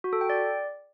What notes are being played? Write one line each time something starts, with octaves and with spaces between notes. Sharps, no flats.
F#4
A4
G5
D5